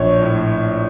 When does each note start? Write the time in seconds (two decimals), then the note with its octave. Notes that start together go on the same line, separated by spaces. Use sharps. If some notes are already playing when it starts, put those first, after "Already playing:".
Already playing: A#1 C#5
0.21 A2